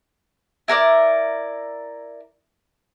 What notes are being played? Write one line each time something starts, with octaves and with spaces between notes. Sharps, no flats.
E4 A#4 C#5 D5